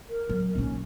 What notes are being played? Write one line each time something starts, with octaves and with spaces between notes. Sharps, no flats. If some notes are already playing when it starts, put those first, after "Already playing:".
A#4
F#3
A#1 C#4 D#4